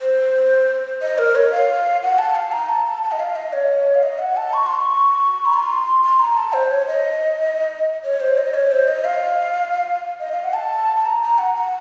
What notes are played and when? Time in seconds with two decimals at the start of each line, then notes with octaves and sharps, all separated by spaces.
0.01 C5
1.02 D#5
1.18 A#4
1.35 C#5
1.52 F5
2.03 F#5
2.19 A5
2.35 F5
2.52 A#5
2.69 A5
2.85 A5
3.03 A5
3.12 D#5
3.20 F5
3.36 D#5
3.53 C#5
3.94 F5
4.03 D#5
4.19 F#5
4.37 A5
4.53 C#6
4.66 C6
4.81 C#6
5.45 A#5
5.53 C6
6.03 C6
6.19 A#5
6.37 A5
6.53 C5
6.71 C#5
6.87 D#5
8.04 C#5
8.20 C5
8.38 D#5
8.54 C#5
8.72 C5
8.88 D#5
9.05 F5
10.20 D#5
10.32 F5
10.44 F#5
10.54 A5
10.96 A5
11.06 A#5
11.22 A#5
11.38 F#5
11.55 F#5